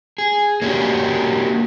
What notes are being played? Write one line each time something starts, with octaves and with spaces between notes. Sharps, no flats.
G#4
A#3 C#4 D4 F#4 G4